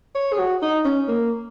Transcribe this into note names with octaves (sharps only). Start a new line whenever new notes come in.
C#5
G#4
F#4
D#4
C#4
A#3